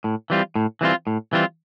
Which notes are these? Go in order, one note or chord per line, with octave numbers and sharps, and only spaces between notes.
A2
E3 G3 C4 F4
A2
E3 G3 C4 F4
A2
E3 G3 C4 F4